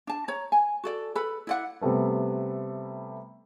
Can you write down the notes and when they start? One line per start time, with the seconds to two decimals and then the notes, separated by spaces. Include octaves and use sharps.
0.07 D4 A5
0.28 C#5 A#5
0.52 G#5
0.84 F#4 A4 D5
1.15 A4 B4 B5
1.47 E4 D5 F#5
1.81 C3 G3 A3 B3